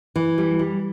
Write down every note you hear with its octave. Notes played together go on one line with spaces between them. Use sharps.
E3
G3
G3